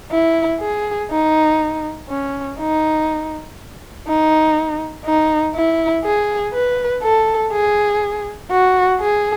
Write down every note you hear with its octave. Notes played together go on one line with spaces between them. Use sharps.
E4
G#4
D#4
C#4
D#4
D#4
D#4
E4
G#4
B4
A4
G#4
F#4
G#4